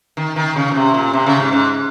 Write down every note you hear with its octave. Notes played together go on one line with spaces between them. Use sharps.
D#3
D#3
C#3
A#2
C3
A#2
C3
C#3
G#2
G#2